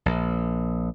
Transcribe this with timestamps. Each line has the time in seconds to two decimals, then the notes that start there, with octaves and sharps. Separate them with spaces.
0.06 A#1